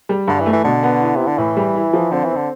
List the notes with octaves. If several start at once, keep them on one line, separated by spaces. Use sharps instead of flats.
G3
G2 D3
E3
A3
E3
B2 D3
B3
E4
C3 E4
D3
A2 E3
G3
E4
F3
D3 C4
E3
C4
D3